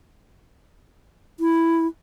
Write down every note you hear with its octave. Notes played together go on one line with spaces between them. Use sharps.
E4